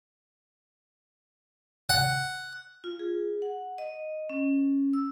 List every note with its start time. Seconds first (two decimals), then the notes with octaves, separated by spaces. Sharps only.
1.89 F#5
2.84 F4
2.99 G#4
3.42 F#5
3.78 D#5
4.30 C#4
4.93 E6